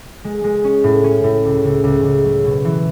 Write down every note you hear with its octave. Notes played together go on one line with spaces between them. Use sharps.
G#3
G#3
C#4
A2
C#4
A2
C#2
C#2
C#2
C#2
F#3
B2
E3